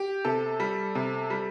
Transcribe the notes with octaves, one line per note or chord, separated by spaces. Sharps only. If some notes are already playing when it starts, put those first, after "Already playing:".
Already playing: G4
C3 A4
G3
C3
G3